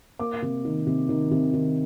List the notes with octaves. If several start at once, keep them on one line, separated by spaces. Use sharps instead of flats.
A#3 D6
C3
D#3
C3
D#3
C3
D#3